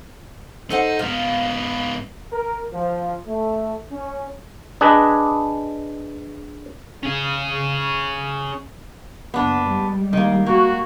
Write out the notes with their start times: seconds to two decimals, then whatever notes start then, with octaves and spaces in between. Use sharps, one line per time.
0.70 D#4 A4 C5 F#5
0.99 G#2 B3 F5
2.32 A#4
2.72 F3
3.27 A3
3.91 C#4
4.81 D4 G#4 B4 D#5
7.03 C#4 G#4
9.34 F#1 B3 D4
9.65 G3 G#3
10.13 D#3 A#3
10.46 A#3 F#4